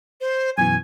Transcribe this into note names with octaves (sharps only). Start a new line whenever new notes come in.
C5
F#2 B2 E3 G#5 G#6